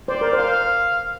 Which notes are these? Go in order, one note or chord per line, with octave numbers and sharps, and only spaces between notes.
C5 D5
A#4
C5 F5